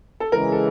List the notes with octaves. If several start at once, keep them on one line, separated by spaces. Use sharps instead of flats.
A4
C#3 E3 G#3 A#4
A4